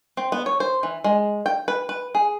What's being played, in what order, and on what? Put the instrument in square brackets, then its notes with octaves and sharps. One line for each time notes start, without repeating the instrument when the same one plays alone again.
[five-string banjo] C4
B3
C#5
C5
E3
G#3
G5
B4
B4
G#4